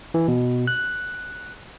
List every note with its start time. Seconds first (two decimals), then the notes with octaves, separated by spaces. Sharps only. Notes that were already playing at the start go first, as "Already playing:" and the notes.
0.14 E3
0.28 B2
0.67 F#6